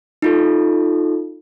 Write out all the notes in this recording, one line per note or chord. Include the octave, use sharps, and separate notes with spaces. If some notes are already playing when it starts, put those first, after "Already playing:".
D#4 F4 A4